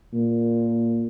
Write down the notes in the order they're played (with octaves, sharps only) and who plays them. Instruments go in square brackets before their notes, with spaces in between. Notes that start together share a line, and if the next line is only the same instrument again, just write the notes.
[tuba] A#2